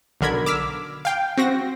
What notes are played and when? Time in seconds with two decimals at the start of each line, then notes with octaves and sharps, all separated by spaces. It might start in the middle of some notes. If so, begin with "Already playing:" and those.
0.21 B1 D3 A#4 B5 G#6
0.46 D6 E6 F6 B6
1.05 F5 G5
1.37 C4 F#4 A#6